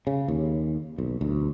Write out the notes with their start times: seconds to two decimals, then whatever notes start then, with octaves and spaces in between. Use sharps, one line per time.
0.07 C#3
0.28 D#2
0.98 B1
1.21 D2